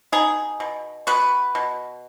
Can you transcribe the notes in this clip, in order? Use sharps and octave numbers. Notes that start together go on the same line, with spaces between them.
B2 D#4 G#4
B2
B3 F#4 B4
B2